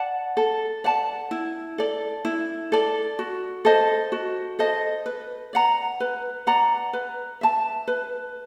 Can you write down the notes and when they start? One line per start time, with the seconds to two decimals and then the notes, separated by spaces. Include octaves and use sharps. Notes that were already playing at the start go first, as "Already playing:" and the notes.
Already playing: D5 F#5 A5
0.37 A4
0.84 D5 F#5 A5
1.31 E4
1.78 A4 D5
2.25 E4
2.72 A4 D5
3.19 F#4
3.65 A4 C5 D#5
4.12 F#4
4.59 A4 C5 D#5
5.06 B4
5.53 D5 F#5 A#5
6.00 B4
6.47 D5 F#5 A#5
6.93 B4
7.41 E5 A5
7.88 B4